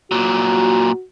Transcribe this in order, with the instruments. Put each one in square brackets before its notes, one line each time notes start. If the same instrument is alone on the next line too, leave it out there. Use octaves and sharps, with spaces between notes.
[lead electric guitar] A#2 F#3 [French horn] F#4